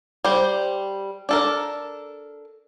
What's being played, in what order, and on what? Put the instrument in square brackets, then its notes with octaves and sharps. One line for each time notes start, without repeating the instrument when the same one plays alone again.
[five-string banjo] G3 C5
D4 A4 A#4